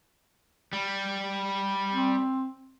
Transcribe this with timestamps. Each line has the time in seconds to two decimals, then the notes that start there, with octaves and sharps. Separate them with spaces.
0.73 G3
1.93 C4